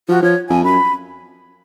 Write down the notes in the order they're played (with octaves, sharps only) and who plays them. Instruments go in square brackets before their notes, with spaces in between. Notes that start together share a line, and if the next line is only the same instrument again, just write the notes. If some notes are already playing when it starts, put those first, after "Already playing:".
[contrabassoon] F3 [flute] F#4
[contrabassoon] F3 [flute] C#5
[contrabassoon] F2 [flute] G#5
[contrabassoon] F#2 [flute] B5